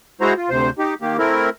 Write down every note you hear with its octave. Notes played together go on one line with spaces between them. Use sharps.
G#3 E4 F#4 C5 A#5
F4
D2 C3 C5
D#4 G4
D#3 A#3 G4
A3 C4 E4 A#4